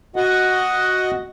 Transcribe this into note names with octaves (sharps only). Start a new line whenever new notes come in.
F#4 D#5 F#5